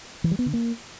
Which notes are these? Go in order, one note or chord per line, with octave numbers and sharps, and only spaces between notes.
E3
G3
B3
D3
A#3